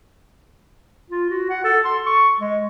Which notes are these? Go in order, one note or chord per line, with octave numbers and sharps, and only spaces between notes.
F4
F#4
F#5
A4
C6
C#6
G#3